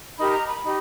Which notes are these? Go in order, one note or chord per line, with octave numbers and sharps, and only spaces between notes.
D#4 G4 A#4 B5
A#5
B5
D#4 G4